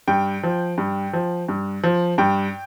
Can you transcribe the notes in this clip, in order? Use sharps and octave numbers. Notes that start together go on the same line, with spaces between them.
G2 G5
F3
G2
F3
G2
F3
G2 G5